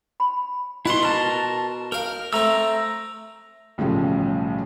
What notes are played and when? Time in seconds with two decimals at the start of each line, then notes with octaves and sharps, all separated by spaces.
0.20 B5
0.86 B2 E4 F#5 C6
1.03 B2 A#4 A5
1.92 A#4 F5 G5
2.33 A3 C4 A#5 E6
3.78 B1 A2 C#3 F3 G3